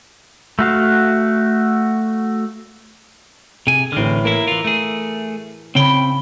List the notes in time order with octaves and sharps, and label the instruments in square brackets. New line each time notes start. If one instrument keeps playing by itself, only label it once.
[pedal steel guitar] A3 F#4 F5
[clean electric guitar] C3 G#5 [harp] G#4
[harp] A1 F6 [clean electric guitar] D3 C4
[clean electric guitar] A#3 E4 [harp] A#4 E6
[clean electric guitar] E3 F4
A3 G#4
[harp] C#3 B5 [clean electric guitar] C4 G5